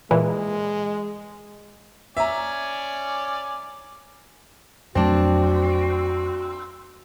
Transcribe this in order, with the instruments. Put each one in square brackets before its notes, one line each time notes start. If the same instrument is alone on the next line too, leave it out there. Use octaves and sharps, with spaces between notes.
[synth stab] A#2 E3 [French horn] G#3
[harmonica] C#4 D5 G#5 [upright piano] E5 A#5
[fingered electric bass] F2 F#3 A3 [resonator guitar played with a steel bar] C4 D4 [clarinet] F#4